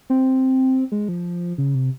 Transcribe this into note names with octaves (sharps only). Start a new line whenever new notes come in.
C4
G#3
F3
C#3
C3